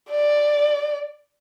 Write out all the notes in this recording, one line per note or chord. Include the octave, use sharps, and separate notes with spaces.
D5